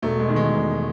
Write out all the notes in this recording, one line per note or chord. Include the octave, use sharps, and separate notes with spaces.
E1 A3
G#3
E2 D#3
G#3
E1